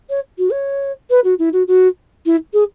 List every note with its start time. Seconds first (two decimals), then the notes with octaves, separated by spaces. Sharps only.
0.09 C#5
0.38 F#4
0.51 C#5
1.10 B4
1.24 F#4
1.38 E4
1.53 F#4
1.67 F#4
2.25 E4
2.53 G#4